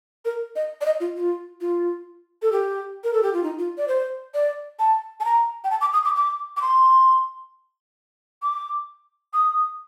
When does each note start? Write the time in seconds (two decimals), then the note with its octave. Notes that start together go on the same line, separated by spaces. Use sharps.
0.25 A#4
0.56 D#5
0.81 D5
0.85 D#5
1.00 F4
1.16 F4
1.61 F4
2.42 A4
2.52 G4
3.04 A#4
3.13 A4
3.23 G4
3.33 F4
3.43 D#4
3.59 F4
3.78 D5
3.88 C5
4.34 D5
4.79 A5
5.20 A5
5.25 A#5
5.64 G5
5.71 A5
5.81 D6
5.93 D#6
6.05 D6
6.15 D6
6.56 D6
6.62 C6
8.42 D6
9.33 D#6